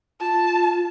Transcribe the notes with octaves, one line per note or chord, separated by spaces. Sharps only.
F4 A5